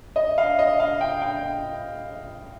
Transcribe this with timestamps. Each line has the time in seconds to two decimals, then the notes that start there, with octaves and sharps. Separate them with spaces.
0.16 D#5
0.38 F5
0.59 D#5
0.80 F5
1.01 G5
1.22 G5